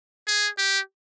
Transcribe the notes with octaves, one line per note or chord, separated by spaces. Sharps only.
G#4
G4